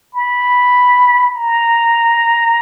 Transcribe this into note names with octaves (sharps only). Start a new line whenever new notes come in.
B5
A#5